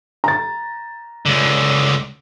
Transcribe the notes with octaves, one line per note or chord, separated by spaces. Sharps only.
A#5 A6
C#2 D3